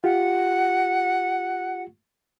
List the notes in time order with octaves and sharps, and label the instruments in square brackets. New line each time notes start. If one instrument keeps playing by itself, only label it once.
[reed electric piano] F4 G4 [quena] F#5